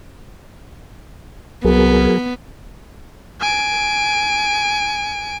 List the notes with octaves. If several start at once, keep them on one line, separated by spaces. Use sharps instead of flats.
C2 F#3 B3 G#4 A#4
G#5 D7